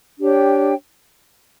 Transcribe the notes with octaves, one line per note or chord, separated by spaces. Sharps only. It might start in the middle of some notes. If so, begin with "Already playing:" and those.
D4 G4 C#5 G5